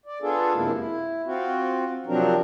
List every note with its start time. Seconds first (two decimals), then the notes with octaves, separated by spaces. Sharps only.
0.06 D5
0.22 B3 D4 F4 G#4 A4
0.54 F#2 C3 G#3 A#3 E4
0.77 E4
1.26 C4 F4 F#4
2.07 C3 F3 F#3 C4 D4 A#4